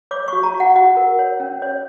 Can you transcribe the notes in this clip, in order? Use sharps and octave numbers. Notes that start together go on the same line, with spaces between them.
C#5 D6
F#4 C#6
A#5
F#4
F#5
F#4 F#5
A#4
C#5
C#4
C#5